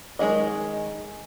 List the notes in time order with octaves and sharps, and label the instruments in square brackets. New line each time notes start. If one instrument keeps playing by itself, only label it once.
[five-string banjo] D#3 G#3 D#4 G#4 D#5